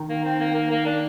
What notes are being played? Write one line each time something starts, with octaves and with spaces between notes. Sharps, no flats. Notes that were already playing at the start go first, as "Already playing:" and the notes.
Already playing: D#3
A#3
C4
A#3
A#3
A#3
D4